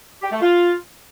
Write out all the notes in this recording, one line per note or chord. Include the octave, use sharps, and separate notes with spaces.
G4
A3
F4